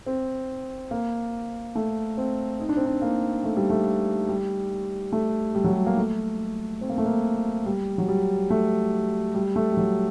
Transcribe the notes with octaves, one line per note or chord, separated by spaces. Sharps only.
C4
A#3
A3
C4
D#4
D4
C4
D4
A#3
A3
G3
A3
G3
A3
G3
F#3
G3
A#3
A3
C4
A#3
A3
A#3
G3
F#3
G3
A3
G3
A3
G3
F#3